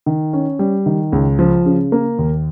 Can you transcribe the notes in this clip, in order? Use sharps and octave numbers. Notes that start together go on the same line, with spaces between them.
D#3
C#4
G3
D#3
C#2
F3
C#3
A#3
D#2